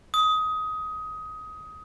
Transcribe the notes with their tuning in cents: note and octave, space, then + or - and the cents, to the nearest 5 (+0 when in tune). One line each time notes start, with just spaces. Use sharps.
D#6 +20